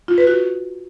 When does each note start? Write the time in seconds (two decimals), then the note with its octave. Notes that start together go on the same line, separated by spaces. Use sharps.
0.08 F4
0.18 B4
0.27 F#4